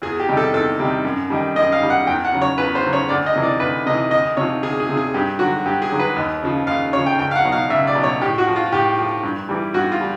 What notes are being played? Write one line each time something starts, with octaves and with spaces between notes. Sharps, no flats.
E2 G#4
G4
C3 D#3 G3
A4
E2 A4
C3 D#3 G3
F#2
D#3 G3
F#2 D#5
F5
D#3 G3
F#5
E2 G5
F#5
C#3 F#3
C#5
E2 B4
C5
C#3 F#3
C#5
D2 D5
D#5
C3 E3
D5
D2 B4
C3 E3 D#5
D2 D#5
C3 F3 C#5
D2 G#4
G#4
C3 F3
G#4
G2 G4
D3 F#3 F#4
G2 G4
G#4
D3 F#3
B4
D#2
C#3 F3
D#2 F5
C#3 F3 C#5
G5
C#2 G5
F5
F#5
B2 F#3
F5
C#2 E5
D5
B2 F#3
C#5
A2 G4
F#4
F3
F4
A2 G4
F3
G2
E3 G3
G2 F#4
F4
G3